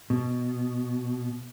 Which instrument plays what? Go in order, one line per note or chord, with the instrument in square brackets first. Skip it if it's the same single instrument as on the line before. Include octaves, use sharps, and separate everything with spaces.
[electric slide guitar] B2